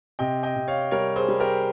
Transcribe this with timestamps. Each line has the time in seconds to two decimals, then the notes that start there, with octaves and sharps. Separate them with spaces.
0.19 C3 D#5 G5
0.43 D#5 G5
0.55 C3
0.68 C#5 F5
0.91 G3 A#4 C#5
1.16 G#4 C5
1.28 G3
1.40 G4 A#4